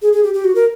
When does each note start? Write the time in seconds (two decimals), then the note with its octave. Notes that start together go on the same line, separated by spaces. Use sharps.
0.02 G#4
0.13 G#4
0.23 G4
0.34 G4
0.44 F#4
0.55 A#4